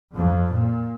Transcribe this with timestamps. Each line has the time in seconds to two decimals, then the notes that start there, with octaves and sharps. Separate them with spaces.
0.14 F2
0.51 A#2